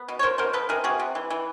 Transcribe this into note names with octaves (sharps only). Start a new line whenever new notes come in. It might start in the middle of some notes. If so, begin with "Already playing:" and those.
Already playing: B3
B2
C#5
B2 A#4 C5
B2 A#4 C5
F3 A4 B4
C3 G#4 A#4
C3 F#4 G#4
C3
E3
E3